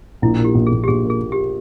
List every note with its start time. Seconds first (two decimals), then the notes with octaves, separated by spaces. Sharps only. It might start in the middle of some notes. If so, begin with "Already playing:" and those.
0.22 A#1 E4
0.39 A#2
0.45 G4
0.55 A#1
0.67 G#4
0.72 A#1
0.83 G4
0.88 A#1 G#4
1.04 A#2
1.10 G#4
1.21 A#2
1.32 G4